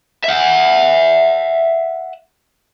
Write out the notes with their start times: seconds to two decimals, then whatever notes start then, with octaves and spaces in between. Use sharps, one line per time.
0.24 E5 F#5